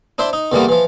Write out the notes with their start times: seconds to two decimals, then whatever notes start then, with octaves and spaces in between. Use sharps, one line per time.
0.18 D4 E4 C5 E5 C6
0.33 D#4
0.52 E2 D3 E3 G3 A#3 B3
0.69 E3 F3